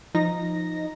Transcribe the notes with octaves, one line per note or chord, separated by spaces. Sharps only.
F3 D#4 A#6